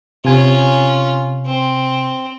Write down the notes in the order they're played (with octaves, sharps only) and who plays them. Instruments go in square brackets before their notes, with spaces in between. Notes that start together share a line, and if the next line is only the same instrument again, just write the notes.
[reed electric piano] C3 G#5 [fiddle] C#4 F4
[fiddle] C4